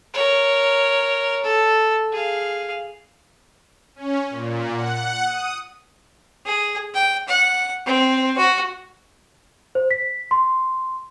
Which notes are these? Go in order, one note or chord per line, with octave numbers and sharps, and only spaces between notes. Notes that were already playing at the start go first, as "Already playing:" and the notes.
A#4 C#5
A4
G#4 F5
C#4
A#2
F#5
D#6
G#4
G5
F#5
C4
F#4
C5
B6
C6